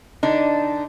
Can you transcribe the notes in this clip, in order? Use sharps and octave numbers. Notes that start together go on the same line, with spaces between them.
D3 D4 D#4